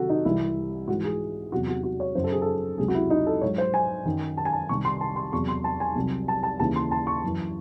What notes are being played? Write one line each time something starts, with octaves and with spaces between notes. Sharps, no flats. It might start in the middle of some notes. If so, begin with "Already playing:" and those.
Already playing: C3 D#3 F#3 F#4 A4
D#4
C2 C3 E3 E4
G#2 F#4
E3
G#4
E2 C3 F#3 F#4
F#4
F#4
C#5
F#2 C#3 F#3 C5
A4
G#4
A4
C#2 C3 F#3 G#4
F#4
E4
D#4
A4
G#2 F#3 C#5
C5
G#5
F#2 D#3 F#3
A5
G#5
A5
C2 C3 D#3 C#6
C6
A5
C6
E2 C3 F#3 C#6
C6
A5
G#5
C2 C3 F#3
A5
A5
D#2 C#3 E3 A5
C6
A5
C#6
F#2 E3